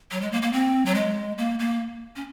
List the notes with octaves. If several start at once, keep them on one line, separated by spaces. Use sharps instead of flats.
F#3
G#3
A#3
A#3
C4
F#3
G#3
A#3
A#3
C#4